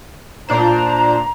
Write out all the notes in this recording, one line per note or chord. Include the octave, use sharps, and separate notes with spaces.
A#2 D4 C5 A#5